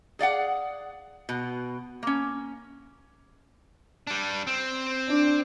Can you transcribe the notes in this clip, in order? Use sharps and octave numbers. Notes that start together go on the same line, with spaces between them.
G#4 D5 F5 F#5
B2
A#3 C#4
G3 D4
C4
D4